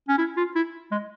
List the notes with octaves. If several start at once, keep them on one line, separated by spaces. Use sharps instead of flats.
C#4
E4
F4
E4
G#3